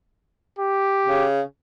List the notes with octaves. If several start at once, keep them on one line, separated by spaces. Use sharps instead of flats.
G4
C#3